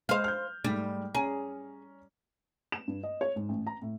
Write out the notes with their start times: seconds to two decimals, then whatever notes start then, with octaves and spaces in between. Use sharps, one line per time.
0.09 G#3 C5 D#5 F5
0.24 F6 G6
0.64 G#2 G3 A3
1.15 C#4 G#4 A#5
2.72 E7
2.88 G2
3.03 D#5
3.21 C#5
3.36 G#2
3.49 A1
3.67 A#5
3.82 A2